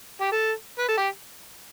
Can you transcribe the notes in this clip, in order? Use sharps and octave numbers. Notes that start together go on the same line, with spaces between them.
G4
A4
B4
A4
G4